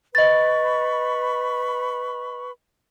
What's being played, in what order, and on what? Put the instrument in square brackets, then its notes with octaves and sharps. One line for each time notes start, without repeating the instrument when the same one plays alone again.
[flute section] B4 B5 C#6 [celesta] D#5 A6